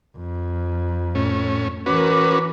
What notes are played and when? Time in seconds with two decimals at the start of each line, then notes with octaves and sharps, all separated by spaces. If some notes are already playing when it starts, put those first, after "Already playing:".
0.17 F2
1.15 A2 C#4
1.86 E3 C#4 F#4 A#4 B4 D6